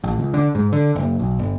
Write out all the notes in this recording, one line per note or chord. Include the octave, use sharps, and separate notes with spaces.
A1
C#2
D3
G#2
D3
F#1
B1
G1